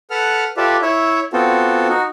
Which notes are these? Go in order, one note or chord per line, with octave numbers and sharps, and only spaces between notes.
A4 B4 F#5 F6
F4 G4 A4 B4 D5 E5
E4 C#5 E5
B3 C4 F4 F#4 A4
D#4 F#4